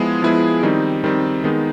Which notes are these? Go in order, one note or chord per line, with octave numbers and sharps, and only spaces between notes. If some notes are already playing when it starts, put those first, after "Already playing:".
Already playing: F3 G#3 B3 E4 G#4
F3 G#3 B3 E4 G#4
D#3 G3 C4 D#4
D#3 G3 C4 D#4
D#3 G#3 B3 D#4